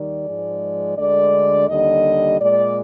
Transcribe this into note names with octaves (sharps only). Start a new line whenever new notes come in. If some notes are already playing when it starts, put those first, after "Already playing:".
Already playing: D#2 D#3 G3 D5
G#2 F3 G#3
D2 D3 G#3 D5
D#2 D3 G3 D#5
A#2 G#3 D5